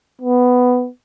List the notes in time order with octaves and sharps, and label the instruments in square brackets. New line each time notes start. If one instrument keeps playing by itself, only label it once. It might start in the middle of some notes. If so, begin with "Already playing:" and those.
[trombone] B3